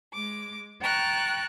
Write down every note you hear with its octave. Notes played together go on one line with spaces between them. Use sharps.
G#3 D6
G5 A5 A#5 C#6 F#6